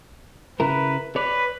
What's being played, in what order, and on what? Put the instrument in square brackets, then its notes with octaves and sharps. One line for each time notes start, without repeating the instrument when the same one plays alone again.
[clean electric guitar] C#3 E4 A#4 [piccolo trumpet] B4
[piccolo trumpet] B4 [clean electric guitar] C#5 D5